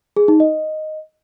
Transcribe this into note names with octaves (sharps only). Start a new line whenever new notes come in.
G#4
D#4
D#5